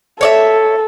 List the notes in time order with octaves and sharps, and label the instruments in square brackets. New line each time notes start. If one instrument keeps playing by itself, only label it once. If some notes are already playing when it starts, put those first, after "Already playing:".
[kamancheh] A4 [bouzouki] C#5 D5 E5